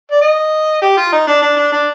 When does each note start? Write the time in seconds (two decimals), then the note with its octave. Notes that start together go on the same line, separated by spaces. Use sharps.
0.11 D5
0.22 D#5
0.82 G4
0.97 F4
1.13 D#4
1.27 D4
1.42 D4
1.57 D4
1.72 D4